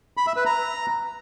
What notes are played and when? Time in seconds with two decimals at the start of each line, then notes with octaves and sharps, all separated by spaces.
0.17 B5
0.27 E5
0.36 B4
0.46 A#5